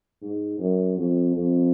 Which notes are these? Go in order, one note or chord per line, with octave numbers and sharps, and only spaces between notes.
G#2
F#2
F2
F2